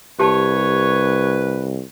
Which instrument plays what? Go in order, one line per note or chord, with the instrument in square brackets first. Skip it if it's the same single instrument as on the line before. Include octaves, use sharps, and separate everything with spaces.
[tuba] C2 [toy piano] G4 A5 [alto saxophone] B4 [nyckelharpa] C#5